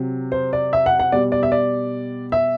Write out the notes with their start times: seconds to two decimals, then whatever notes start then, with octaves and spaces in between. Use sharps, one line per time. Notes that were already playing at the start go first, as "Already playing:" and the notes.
Already playing: C3 F#3
0.32 C5
0.53 D5
0.73 E5
0.86 F#5
0.99 F#5
1.12 B2 G3 D5
1.32 D5
1.43 E5
1.52 D5
2.32 E5